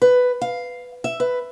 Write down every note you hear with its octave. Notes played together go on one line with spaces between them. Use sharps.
B4
F5
E5
B4